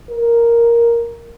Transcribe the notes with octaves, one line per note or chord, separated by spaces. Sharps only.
A#4